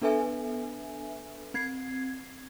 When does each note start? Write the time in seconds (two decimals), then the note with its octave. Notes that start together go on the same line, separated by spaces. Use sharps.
0.02 B3 D4 A4 B4 E5 G#5
1.54 C4 G#6 C7